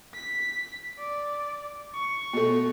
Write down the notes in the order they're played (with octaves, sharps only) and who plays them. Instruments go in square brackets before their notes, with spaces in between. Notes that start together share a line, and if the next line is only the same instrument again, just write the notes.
[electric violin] B6
D5
C#6
[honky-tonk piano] B2 A3